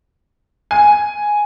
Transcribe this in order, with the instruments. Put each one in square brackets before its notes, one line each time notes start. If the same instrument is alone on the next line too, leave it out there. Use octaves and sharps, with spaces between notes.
[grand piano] G#5